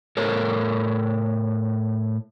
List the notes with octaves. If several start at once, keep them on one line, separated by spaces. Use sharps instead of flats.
A2 A4 A#4 C#5